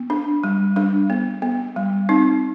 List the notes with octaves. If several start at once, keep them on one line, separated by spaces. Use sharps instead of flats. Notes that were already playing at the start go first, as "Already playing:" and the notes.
Already playing: B3
D4
G3
G3 D4
B3
B3
G3
C4 D#4